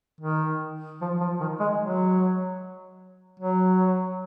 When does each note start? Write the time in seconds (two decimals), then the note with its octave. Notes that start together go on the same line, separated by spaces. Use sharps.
0.20 D#3
1.01 F3
1.20 F3
1.40 D#3
1.60 G#3
1.80 F#3
3.40 F#3